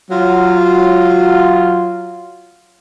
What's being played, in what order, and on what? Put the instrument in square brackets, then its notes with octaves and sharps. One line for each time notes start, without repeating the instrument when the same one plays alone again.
[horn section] F#3 F4